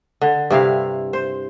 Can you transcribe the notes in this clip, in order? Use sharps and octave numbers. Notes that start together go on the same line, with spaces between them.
D3
G2 C3 E4 F5
C5